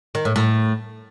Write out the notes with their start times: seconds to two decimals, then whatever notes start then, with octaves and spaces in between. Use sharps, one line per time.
0.15 D#3
0.25 A2
0.36 A2